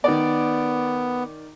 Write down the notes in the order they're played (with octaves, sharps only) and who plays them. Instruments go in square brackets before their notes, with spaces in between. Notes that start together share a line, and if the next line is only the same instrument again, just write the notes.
[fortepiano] D#3 D5 [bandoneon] B3